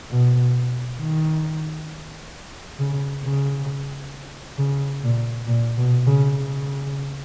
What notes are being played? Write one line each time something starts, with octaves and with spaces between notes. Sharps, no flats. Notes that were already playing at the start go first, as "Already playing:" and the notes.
B2
D#3
C#3
C#3
C#3
A#2
A#2
B2
C#3
C#3